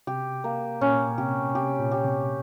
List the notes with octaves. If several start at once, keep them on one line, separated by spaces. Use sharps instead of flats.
C3 G4
A#3
A#2 C#4
C3 G4
C3 G4
A#2
G4
C3